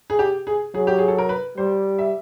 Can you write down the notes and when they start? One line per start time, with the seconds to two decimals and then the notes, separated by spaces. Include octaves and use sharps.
0.10 G#4
0.19 G4
0.47 G#4
0.74 F#3 G#4
0.87 G4
0.98 G#4
1.08 A4
1.18 A#4
1.29 B4
1.57 G3 C5
1.98 E5